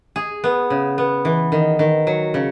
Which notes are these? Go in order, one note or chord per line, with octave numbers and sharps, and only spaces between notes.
G#4
B3
C#3
B3
E3
D#3
D#3
F#3
C#3